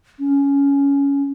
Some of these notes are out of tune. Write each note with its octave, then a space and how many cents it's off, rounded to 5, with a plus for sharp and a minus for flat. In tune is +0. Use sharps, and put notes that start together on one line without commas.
C#4 +15